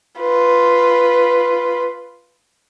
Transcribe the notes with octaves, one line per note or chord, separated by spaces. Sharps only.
F4 B4